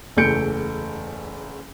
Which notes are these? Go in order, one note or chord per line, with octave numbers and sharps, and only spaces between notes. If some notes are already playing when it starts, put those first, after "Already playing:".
F#1 E2 A3 G6 C#7 D7